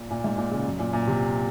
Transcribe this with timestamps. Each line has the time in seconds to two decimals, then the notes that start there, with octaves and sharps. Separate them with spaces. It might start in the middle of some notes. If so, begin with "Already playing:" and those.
Already playing: A#2
0.11 A#2
0.24 G#2
0.38 A#2
0.51 C#3
0.65 F#2
0.79 A#2
0.93 A#2
1.07 C3